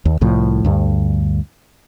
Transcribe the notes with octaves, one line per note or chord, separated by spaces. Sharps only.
D#2
C2 A2 F3
D2 G2